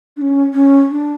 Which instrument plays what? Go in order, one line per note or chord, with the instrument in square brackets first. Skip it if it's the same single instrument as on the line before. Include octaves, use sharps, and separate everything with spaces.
[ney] D4
C#4
C#4
D4